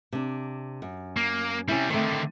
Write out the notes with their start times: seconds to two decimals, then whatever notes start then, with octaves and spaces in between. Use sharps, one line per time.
0.12 C3 D4
0.82 F#2
1.17 A#3
1.68 C3 G3 C#4 E4
1.90 D3 D#3 A3 C4